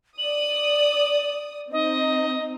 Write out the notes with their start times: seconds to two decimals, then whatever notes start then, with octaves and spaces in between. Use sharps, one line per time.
0.18 D5 D#6 F#7
1.72 C4 D#4 D#5